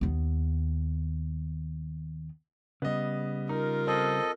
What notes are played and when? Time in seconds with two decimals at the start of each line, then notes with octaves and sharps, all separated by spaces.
0.01 D#2 B3
2.82 C#3 G3 B3 D#5
3.49 D#4 F4 A#4
3.87 C4 A4 D#5